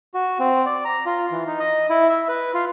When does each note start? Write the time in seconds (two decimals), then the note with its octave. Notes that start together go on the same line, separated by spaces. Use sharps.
0.14 F#4
0.39 C4
0.66 D5
0.85 A#5
1.06 F4
1.31 E3
1.47 D#4
1.59 D#5
1.90 E4
2.10 E5
2.28 B4
2.54 F4